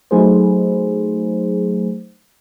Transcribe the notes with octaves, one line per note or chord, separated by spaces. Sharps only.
F#3 A3 D#4 G#4 B4 C5